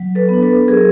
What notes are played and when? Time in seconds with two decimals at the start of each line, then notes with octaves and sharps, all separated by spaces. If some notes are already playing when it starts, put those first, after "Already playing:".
Already playing: F#3
0.15 A4 B4
0.29 B3 D4
0.43 A4 B4
0.68 F#3 G#4 A#4